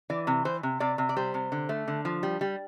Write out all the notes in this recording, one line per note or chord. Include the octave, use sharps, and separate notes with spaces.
E3 D5
C3
E3 C5
C3
C3 D5
C3
D5
G3 C5
C3
D3
A3
D3
F3
G3
G3